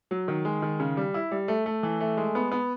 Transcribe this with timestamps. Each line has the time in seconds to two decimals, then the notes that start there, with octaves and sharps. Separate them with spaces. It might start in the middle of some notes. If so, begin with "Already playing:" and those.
0.11 F#3
0.28 D#3
0.45 G#3
0.62 D#3
0.80 C#3
0.97 G3
1.14 E4
1.32 G3
1.48 A3
1.66 A3
1.83 E3
2.00 A3
2.17 G#3
2.35 B3
2.52 B3